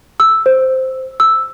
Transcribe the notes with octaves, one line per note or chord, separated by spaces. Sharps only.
E6
C5
E6